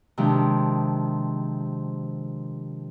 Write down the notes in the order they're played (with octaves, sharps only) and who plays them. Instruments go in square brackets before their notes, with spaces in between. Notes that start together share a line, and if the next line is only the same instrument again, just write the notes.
[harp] C3 D#3 F3 G#3 D4